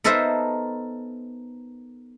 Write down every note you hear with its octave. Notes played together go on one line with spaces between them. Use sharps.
B3 D#4 A4 A#4 C5 E5